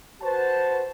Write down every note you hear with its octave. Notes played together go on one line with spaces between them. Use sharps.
F#4 B4 C5 A5